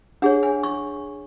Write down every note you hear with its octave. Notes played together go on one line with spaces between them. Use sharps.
D4 G#4 C#5 F#5
G#5
C#6